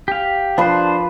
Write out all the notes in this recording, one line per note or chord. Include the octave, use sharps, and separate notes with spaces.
G4 F5
F3 D4 B4 C5